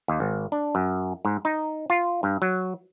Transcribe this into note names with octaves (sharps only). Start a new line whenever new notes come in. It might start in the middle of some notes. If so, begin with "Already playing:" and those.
D#2
G#1
D4
F#2
G#2
D#4
F4
G2
F#3